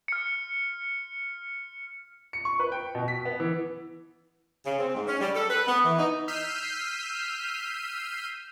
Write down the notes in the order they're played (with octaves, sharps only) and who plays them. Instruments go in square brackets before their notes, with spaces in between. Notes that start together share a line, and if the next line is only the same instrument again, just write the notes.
[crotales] F6 C#7
[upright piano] C#7
C#6
B4
G5
B2
B6
B3
E3
[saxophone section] C#3
C4
G#2
C#4
G3
A4
B4
B3
E3
D#4
[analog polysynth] E6 F6 G6 B6 C7 D#7